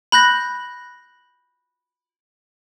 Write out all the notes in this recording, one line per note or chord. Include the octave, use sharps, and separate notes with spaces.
B5 F#6 G6 A#6